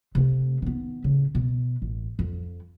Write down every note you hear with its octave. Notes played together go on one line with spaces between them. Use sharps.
C3 A3
D#3 B3
A2 C#3
B2
A1
F2